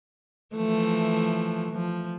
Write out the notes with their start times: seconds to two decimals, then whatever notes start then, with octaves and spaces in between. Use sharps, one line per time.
0.55 E3 F3 A3
1.72 F3